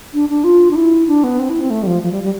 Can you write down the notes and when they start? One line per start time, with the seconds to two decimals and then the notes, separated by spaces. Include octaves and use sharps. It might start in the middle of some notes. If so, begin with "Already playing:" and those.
0.14 D4
0.29 D4
0.44 F4
0.71 D4
0.75 E4
1.07 D4
1.24 B3
1.39 C4
1.50 E4
1.60 C4
1.70 A3
1.83 G3
1.87 F3
2.02 F3
2.12 G3
2.23 G3